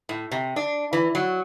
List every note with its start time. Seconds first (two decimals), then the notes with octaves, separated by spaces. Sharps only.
0.09 A2
0.31 C3
0.56 D4
0.93 E3
1.15 F#3